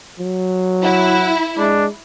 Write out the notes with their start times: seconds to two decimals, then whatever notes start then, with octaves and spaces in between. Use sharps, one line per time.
0.19 F#3
0.83 E4 F#5
1.58 G#3 D4